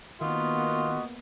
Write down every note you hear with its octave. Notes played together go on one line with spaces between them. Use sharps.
D#3 A#3 B3 F4 F#4 D#5